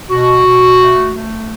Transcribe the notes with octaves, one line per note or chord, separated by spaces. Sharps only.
B2 F#4
B2
A3
A3